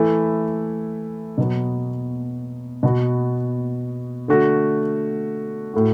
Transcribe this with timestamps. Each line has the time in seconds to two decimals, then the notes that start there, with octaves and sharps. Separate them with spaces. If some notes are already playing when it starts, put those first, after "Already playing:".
Already playing: E3 A3 E4
1.38 B2 F#3 B3
2.83 B2 B3 F#4
4.28 D3 A3 F#4
5.74 A2 A3 F#4